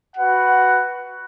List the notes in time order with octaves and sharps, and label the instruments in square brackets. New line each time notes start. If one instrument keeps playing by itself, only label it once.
[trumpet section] F#4 B4 F#5